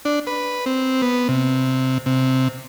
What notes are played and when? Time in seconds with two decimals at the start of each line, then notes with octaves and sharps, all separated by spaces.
0.05 D4
0.27 B4
0.66 C4
1.02 B3
1.29 C3
2.06 C3